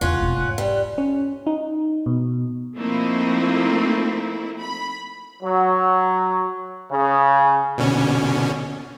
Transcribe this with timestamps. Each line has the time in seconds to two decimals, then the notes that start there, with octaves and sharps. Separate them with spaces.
0.01 E2 C#3 C#4 F4 F#5
0.20 E1 C4
0.41 G#2
0.58 G3
0.98 C#4
1.47 D#4
2.06 B2
2.76 F3 A3 A#3 C4 D#4 E4
4.59 B5
5.42 F#3
6.91 C#3
7.78 B2 D3 C#4